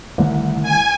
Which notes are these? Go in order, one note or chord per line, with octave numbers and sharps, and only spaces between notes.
C2 D3 D#3 A3
G#5